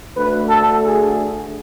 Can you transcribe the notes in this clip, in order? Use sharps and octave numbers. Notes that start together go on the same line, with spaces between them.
D2 D3 A3 B4
A4
G#4